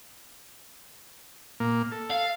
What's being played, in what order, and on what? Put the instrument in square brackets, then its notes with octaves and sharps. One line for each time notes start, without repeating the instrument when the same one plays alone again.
[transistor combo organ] A#2 A#3
A4
[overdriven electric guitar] F5